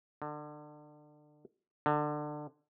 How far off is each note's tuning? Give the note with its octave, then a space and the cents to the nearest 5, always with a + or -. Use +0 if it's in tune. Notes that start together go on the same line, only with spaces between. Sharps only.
D3 +30
D3 +25